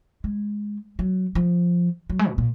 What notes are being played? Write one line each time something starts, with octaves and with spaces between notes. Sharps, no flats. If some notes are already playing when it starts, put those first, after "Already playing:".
G#3
F#3
F3
F#3
G#3
B2
A#2